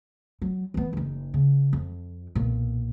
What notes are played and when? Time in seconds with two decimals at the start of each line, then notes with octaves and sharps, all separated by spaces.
0.42 F#3
0.74 E3 B3
0.93 F#1 D#4
1.34 C#3
1.73 F2
2.35 B1 A#2